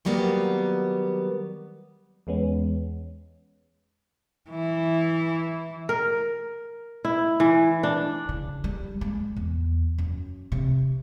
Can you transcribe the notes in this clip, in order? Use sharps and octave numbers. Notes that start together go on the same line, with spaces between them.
D#3 F#3 G3 A#3 B3
E2 G#3 B3 C#4
E3
A#4
E4
E3
D4
C#3
G3
G#3
E2
F#2
C3